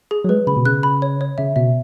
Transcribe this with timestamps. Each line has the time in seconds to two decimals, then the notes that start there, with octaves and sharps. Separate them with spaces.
0.11 G#4
0.24 F#3
0.29 G#3 B4
0.47 C#3 B5
0.57 B2
0.65 C#3 F#6
0.83 B5
1.02 C#5
1.21 C#5
1.38 C#3 E5
1.56 B2 E5